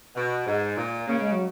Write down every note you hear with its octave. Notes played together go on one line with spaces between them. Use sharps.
B2
G#2
A#2
C#3 A#3
G#3
F#3